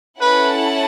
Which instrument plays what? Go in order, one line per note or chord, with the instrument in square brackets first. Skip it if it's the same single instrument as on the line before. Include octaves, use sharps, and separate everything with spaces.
[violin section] C#4 E4 A4 F#5 A5 [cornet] B4